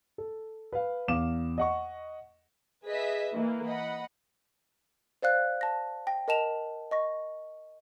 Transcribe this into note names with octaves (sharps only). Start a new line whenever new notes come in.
A4
B4 F5
E2 F5 D6 E7
D#5 F#5 C#6
G#4 B4 D#5 E5 B6
E3 A#3
D#5 F#5 B5
C5 D5 F5 F#6
A5 A#6
G5 A#6
A#4 D#5 A5 E7 F7
D#5 C#6 A#6